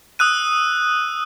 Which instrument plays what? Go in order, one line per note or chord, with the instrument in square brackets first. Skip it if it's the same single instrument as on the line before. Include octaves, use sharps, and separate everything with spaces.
[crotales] D#6 E6 F#6 D#7